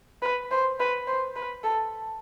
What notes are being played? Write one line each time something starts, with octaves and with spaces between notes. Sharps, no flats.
B4
C5
B4
C5
B4
A4